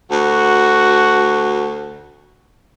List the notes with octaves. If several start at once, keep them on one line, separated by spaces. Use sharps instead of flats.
D2 F#4